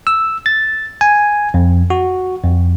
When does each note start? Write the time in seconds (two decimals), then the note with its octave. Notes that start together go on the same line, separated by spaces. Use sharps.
0.07 E6
0.46 A6
1.01 G#5
1.54 F2
1.90 F#4
2.44 F2